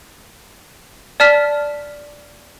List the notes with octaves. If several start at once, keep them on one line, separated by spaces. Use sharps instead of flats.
D5 A5 F6 B6